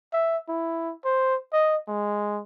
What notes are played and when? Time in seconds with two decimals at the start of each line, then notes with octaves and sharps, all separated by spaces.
0.13 E5
0.48 E4
1.05 C5
1.53 D#5
1.88 G#3